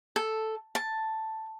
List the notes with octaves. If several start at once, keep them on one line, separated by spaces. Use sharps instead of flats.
A4
A5